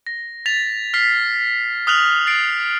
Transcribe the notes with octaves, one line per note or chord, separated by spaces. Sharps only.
A#6
A6 B6 F7
F6 B6 C7
D#6 F6 F#6 F7 F#7
A6 C7 D7